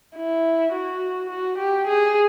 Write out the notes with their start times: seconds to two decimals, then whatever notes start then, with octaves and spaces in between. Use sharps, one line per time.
0.16 E4
0.73 F#4
1.29 F#4
1.58 G4
1.87 G#4